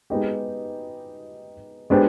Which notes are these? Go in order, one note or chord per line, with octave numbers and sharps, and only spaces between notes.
G#3 B3 D#4 G4
G#3 B3 D4 G4 C5